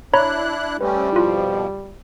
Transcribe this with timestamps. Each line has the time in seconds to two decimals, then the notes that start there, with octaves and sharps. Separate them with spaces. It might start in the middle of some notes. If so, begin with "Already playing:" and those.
0.14 D4 E4 C#5 A#5 B5 F#6
0.81 G3 A3 C4 C#4 B4
1.12 F2 B2 F3 E4 F4